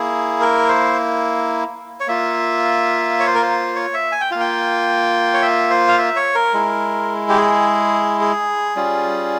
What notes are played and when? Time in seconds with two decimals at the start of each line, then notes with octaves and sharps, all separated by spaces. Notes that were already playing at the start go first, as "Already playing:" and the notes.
Already playing: A#3 E4 G#4
0.41 A#4
0.69 C5
2.00 C#5
2.07 A#3 F4 E5
3.19 C#5
3.27 C5
3.35 A#4
3.42 C5
3.76 C#5
3.94 E5
4.12 G#5
4.21 G5
4.31 A#3 F4 F5
4.40 G5
5.34 C#5
5.42 E5
5.70 C5
5.89 F5
5.98 E5
6.16 C#5
6.35 A#4
6.54 G#3 E4
7.29 G4
7.37 G#4
8.21 G#4
8.76 G3 C#4 F4